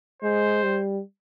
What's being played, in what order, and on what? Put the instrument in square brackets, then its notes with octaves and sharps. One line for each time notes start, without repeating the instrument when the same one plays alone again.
[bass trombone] G#3 [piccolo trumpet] C5
[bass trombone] G3